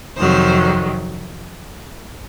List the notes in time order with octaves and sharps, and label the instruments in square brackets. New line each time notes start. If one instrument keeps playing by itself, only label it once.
[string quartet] F2 C3 D#3 F#3 C5